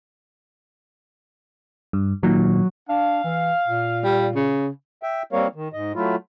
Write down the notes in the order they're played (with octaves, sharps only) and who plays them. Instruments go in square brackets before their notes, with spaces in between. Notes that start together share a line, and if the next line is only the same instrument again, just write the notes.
[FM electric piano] G2
[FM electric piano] A#2 D#3 [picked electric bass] F#3
[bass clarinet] D4 [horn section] F5
[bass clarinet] E3
A#2
[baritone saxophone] G3
C#3
[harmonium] E5 G5
G3 A#3 C4 A#4 C#5 F5
D#3
G#2 D#5
F#3 A3 E4 F4